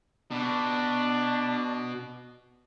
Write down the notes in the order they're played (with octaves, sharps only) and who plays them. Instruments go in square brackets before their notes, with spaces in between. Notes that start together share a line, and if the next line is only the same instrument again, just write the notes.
[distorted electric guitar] B2 [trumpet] D4